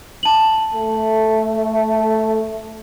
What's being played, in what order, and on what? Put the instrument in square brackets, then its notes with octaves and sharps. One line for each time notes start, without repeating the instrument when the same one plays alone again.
[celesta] A5 F#7
[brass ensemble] A3